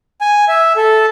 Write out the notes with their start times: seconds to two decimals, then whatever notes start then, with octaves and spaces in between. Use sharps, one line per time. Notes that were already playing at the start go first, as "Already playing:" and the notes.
0.21 G#5
0.48 E5
0.77 A4